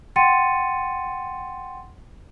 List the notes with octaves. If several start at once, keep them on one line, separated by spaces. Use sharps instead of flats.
F#5 G5 C6 A6 C#7 D#7